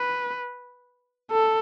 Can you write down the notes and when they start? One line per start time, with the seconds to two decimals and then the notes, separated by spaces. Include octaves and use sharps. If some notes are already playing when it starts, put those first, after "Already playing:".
Already playing: B4
1.31 A4